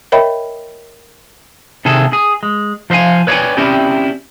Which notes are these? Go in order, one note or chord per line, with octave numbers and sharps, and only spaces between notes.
A#4 C#5 D#5 E5 G5 B5
C3 D#3 G#4 A4
G#4
G#3
F3 C5 E5 F5 G#5
B4 C#5 D5 F5 G5 G#5
C4 C#4 E4 G4 D5